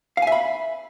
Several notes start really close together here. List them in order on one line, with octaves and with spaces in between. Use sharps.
F5 G#5 E5 B5